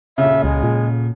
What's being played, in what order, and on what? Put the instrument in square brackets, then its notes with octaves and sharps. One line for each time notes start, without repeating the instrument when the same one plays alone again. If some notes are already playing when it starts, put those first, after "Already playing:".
[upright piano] D#1 C#3 [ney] E5
[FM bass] C#2 [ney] G#3
[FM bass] A#2